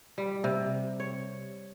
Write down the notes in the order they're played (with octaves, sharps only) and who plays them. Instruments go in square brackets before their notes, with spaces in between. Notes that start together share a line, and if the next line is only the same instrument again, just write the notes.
[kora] G3
C3
C#5